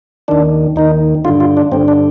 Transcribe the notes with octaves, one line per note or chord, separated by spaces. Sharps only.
D#2 D#3 D4
D#2 D#3 D#4
G2 D3 F4
F4
D4
G2 D3 C4
D4